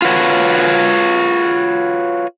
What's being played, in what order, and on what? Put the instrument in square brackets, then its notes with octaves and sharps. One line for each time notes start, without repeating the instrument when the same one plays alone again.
[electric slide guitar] F4 F#4 B4 C#5